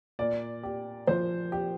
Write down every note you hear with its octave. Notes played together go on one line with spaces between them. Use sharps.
A#2 D5
G4
F3 C5
G4